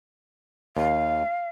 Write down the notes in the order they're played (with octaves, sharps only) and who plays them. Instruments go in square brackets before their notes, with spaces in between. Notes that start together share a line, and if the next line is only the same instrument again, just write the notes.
[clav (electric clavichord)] D#2 [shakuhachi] F5